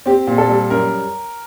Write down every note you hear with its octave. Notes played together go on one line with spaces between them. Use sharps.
C4 G4
A#2
A4
G3
F#2 A#4